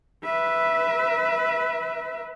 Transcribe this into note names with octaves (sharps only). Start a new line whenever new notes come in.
B4 E5